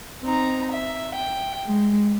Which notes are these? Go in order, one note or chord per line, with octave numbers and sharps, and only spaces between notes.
C4 D#4 A#5
E5
G5
G#3